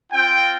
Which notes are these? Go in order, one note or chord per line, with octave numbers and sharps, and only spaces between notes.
C4 F4 G5